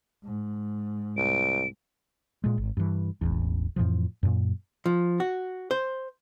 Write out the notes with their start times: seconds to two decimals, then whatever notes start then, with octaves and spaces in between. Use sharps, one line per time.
0.25 G#2
1.17 C2 D7
2.44 A#2 G#3
2.58 G#1
2.77 G2 E3
3.21 E1 A1 E2
3.76 F2 A2 E3 F3
4.23 F#2 A#2
4.86 F3
5.20 F#4
5.71 C5